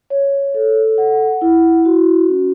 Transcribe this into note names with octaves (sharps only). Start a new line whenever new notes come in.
C#5
A4
F#5
E4
F#4
C#4